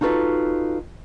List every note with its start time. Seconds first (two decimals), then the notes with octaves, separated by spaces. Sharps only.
0.01 D#4 F4 F#4 A4 B4